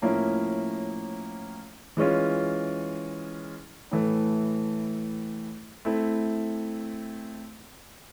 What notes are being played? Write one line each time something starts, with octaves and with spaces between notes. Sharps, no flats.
A2 F3 A#3 C#4 E4
E3 G#3 C#4 F4
A2 E3 A3
A3 C4 E4